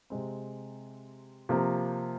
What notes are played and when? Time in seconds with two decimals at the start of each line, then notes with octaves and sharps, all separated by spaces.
0.10 C3 G#3 C4
1.49 C3 F3 A#3